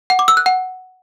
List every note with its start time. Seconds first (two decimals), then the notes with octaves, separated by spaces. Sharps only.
0.10 F#5
0.19 D6
0.28 E6
0.37 F#6
0.46 F#5